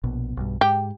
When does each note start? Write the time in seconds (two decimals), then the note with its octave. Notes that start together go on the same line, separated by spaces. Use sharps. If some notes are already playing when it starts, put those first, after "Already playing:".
0.04 A#1 B2
0.37 B1 G2
0.61 G#2 G4